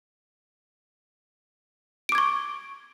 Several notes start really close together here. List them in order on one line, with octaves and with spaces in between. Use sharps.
D7 D6 G#6 C#6